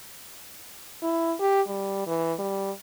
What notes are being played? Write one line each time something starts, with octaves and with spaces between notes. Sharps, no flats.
E4
G4
G3
E3
G3